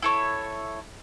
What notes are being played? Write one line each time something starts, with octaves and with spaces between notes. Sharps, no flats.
E4 A4 C#5